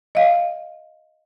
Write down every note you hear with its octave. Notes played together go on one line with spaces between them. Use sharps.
D#5 F5